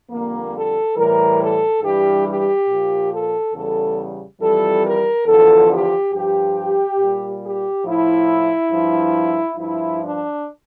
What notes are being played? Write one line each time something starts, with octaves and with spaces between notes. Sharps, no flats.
F2 D3 G3 A#3
A4
A2 E3 G3 A#4
A4
G2 E3 G3 G4
G4
A#2 F3
A4
E2 C#3 G3 A4
F2 E3 G3 A4
A#4
E2 D3 F3 A4
G4
G2 F3 G4
A#2 G3
G4
A2 F3 E4
G2 F3
G2 F3 E4
D4